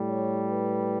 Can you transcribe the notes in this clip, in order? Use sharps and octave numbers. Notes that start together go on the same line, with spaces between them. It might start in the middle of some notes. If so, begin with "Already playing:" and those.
Already playing: A2 G3
C#5
B4